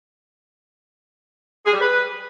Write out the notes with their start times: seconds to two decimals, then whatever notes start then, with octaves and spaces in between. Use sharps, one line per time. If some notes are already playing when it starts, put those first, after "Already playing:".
1.66 G#4
1.73 G3
1.80 B4